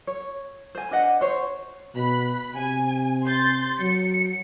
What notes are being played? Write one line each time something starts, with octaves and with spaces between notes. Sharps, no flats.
C#5
C5 G#5
D4 B4 D#5 F#5
C5 C#5
B2 B5 F#6
C3 G#5
C6 G6 A6
F#3 C#7